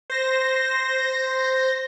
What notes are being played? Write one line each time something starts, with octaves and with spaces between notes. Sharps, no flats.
C5 A#6